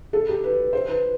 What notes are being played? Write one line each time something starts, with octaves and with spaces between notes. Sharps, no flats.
A4
G4
B4
C5
B4